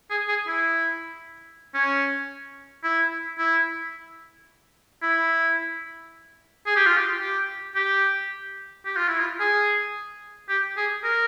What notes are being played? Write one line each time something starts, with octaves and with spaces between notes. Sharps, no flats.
G#4
G#4
E4
C#4
E4
E4
E4
G#4
G4
F4
G4
G4
G4
G4
F4
E4
F4
G#4
G4
G#4
A#4